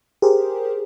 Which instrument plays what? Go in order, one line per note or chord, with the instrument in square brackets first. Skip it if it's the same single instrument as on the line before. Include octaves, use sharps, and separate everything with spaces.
[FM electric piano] G4 G#4 A#4 C5